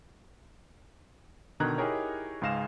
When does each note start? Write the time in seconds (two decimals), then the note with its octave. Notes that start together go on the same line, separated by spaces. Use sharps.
1.60 B2 D3 D#3 A#5 F#6 G#6
1.78 D#4 E4 G4 G#4 A#4 C#5
2.42 C#2 G#2 G#4 F5 A#6 E7